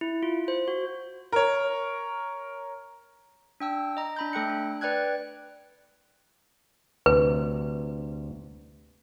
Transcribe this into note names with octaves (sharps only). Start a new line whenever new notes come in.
E4
F4
C5
F#4
A#4 C#5
D4 G5 E6
D#5 A#5
D4 B5 G6
A3 A4 G5 F#6 C#7
D4
B4 D5 G5 F#6 G#6
D2 C3 B4